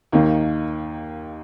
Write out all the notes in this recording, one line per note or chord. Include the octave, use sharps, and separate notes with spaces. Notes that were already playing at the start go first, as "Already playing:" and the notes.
D#2 D#3 A#3